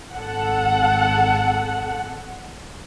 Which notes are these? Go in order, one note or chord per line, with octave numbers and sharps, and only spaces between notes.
G#1 A4 F#5